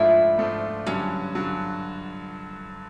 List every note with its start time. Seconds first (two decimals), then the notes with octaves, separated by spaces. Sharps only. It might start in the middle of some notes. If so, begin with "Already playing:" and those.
Already playing: G#2 F3 A3 D4 E4 F4
0.38 G#2 F3 A3 D4 F4
0.87 G2 D3 F#3 C#4
1.35 G2 D3 F#3